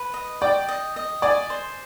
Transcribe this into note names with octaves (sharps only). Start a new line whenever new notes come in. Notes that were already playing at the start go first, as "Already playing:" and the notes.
Already playing: B4
D#5
D5 G5
D#5
D#5
D5 G#5
C5